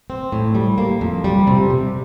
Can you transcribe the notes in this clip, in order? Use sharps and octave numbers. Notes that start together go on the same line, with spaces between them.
C4
A2
G3
A#3
F2
G3
C3
C3